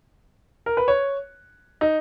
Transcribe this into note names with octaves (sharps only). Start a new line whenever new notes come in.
A#4
B4
C#5
D#4